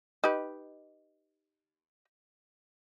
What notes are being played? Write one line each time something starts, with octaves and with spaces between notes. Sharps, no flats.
D#4 G4 B4